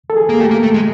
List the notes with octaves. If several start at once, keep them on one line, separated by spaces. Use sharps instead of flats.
A4
G#4
A#3
A3 G4
A#3
A3
G#3